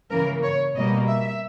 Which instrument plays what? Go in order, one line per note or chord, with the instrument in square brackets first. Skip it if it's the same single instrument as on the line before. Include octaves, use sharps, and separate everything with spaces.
[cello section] C#3 E3 A#3 A#4
C#5
B2 G3 A#3 D#5
E5